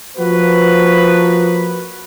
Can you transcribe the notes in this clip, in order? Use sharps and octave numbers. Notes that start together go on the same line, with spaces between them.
F3 A#3 F#4 B4